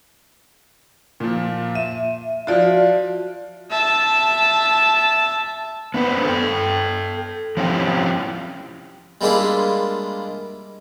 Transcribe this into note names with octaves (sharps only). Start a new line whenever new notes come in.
A#2 F3
E5 D#7
F3 F4 F#4 D5
E5 A5
B3 D4 B4 C5
A4 G5
F3 C4 C#4 E4 F4 G4
G3 G#3 A#3 D4 E4 F4